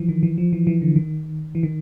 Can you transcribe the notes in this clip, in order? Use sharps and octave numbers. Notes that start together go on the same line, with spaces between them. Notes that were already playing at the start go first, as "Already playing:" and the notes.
Already playing: E3 F3
D#3
E3
F3
E3
E3
D3
D#3
E3
D#3